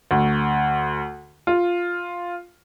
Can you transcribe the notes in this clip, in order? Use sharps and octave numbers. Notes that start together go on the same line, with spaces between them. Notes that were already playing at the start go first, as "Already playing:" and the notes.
D2
F4